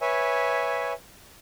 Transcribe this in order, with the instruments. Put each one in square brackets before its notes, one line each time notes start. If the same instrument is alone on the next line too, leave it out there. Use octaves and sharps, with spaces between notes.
[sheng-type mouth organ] B4 C#5 E5 G#5